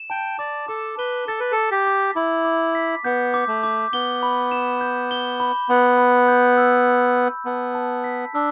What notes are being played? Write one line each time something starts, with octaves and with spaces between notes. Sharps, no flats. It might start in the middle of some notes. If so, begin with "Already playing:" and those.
Already playing: E7
G5 A5
D5 D6
A4 D6
B4 G7
A4 A6
B4
A4
D6
G4
D6
E4 D6
D6
B6
B3 G6
D6
A3
D6
B3 G7
B5
E7
G6
G7
B5
B3 B5
B5
G6
E6
B5
B5
B3 A5
A5
B6
D4 E6